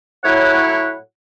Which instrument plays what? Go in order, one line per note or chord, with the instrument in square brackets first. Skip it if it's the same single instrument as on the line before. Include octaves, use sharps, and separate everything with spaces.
[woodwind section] A2 F#3 E4 C#5 F#5